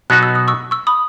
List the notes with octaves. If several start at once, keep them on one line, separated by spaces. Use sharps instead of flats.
B2 F#3 B3 D#4 F#4 F#6
E6
D#6
C#6 E6
C#6 E6
B5 D#6